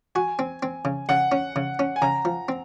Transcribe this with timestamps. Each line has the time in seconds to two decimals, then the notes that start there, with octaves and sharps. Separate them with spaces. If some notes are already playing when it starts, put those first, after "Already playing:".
0.15 F#4 G#5
0.39 C4
0.63 C4
0.85 C#3
1.09 C#3 F#5
1.32 C#4
1.56 C#3
1.79 C#4
1.96 G#5
2.02 C#3 A#5
2.25 F3
2.49 C4